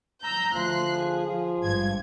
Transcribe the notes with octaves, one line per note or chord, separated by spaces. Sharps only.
A#5 E6 G6
D2 F3 C6 F#6
G#4
F3
G#1 G2 G#6